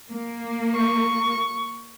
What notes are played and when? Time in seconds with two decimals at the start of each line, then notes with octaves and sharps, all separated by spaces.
0.12 A#3
0.75 C#6